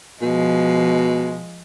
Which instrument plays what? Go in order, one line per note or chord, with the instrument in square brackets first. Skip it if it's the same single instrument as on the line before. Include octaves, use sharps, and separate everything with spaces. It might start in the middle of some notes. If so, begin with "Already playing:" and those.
[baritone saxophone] B2 [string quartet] F3 G#3